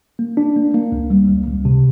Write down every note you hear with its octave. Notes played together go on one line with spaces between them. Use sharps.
A#3
D4
A#3
A#3
C#2
G3
C#2
C#2
C3